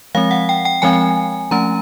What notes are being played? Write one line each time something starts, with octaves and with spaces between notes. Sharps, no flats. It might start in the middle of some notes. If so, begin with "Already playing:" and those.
F3 G#3 C4 F5
F#5
G5
G5
F3 G#3 C4 G#5
F3 A3 C#4 A#5